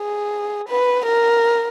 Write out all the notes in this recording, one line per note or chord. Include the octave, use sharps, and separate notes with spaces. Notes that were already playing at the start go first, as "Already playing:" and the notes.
Already playing: G#4
B4
A#4